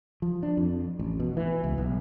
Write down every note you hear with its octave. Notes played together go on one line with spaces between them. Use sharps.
F3
D4
F2
A1
B2
E3
C#2
B1